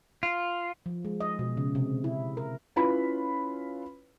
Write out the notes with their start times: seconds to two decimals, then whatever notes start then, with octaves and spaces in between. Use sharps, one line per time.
0.23 F4
0.86 F3
1.05 G#3
1.20 D#5
1.39 B2
1.57 C#3
1.75 C3
2.04 E4
2.37 A#4
2.76 C#4 E4 F4 B4 C#5 B5